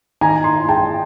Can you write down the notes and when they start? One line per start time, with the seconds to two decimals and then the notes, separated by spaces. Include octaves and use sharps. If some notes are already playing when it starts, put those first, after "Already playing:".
0.21 D#3 G#5 A#5
0.44 A#5 C6
0.68 G#3 G5 A5